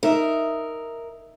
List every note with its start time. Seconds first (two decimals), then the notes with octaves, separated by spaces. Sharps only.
0.03 D#4 A#4 E5 D#6